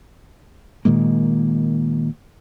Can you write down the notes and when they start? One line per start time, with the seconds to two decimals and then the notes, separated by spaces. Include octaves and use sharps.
0.85 A#2 D#3 G#3 A#3